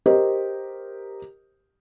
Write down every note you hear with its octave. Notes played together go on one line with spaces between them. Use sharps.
G4 A#4 C5 D#5